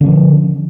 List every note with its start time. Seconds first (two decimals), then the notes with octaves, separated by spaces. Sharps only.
0.01 D3
0.03 C#4
0.06 F3